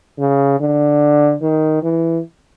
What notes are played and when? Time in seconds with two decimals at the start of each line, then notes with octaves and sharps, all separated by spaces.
0.19 C#3
0.61 D3
1.42 D#3
1.83 E3